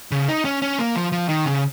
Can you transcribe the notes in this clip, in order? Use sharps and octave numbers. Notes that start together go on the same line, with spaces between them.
C#3
D#4
C#4
C#4
A#3
F3
F3
D#3
C#3